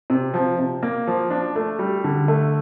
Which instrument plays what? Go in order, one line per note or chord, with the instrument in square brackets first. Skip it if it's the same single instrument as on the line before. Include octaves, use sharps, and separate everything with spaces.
[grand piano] C3
F3
C3
A#3
F3
D4
A3
G3
D3
A3